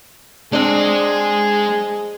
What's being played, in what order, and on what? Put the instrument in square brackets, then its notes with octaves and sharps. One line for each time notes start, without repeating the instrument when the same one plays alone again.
[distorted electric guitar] G#3 D#5 [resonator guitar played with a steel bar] C4 D4 [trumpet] G#4